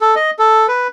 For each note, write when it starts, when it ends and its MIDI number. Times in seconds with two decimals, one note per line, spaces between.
0.01 0.15 69
0.16 0.31 75
0.39 0.67 69
0.68 0.88 71